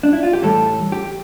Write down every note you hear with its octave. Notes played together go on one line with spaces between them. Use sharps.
D4
E4
F4
G4
A2 E3 G3 A4
G4